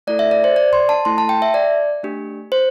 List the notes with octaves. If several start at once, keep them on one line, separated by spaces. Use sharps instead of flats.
A3 E4 A4 D5
E5
D5
C5
D5
C6
A5
A3 E4 A4 C6
A5
G5
E5
D5
A3 D4 G4
C5